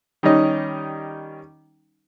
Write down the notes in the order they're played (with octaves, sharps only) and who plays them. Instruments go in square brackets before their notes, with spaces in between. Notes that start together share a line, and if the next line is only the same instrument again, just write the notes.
[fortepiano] D#3 G3 C#4 D#4